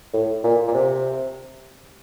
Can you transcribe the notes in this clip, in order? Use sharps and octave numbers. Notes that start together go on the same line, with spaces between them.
A2
A#2
A#2
C3